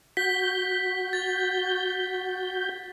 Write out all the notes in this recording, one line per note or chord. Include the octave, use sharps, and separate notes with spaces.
F#4 G6 B6
A6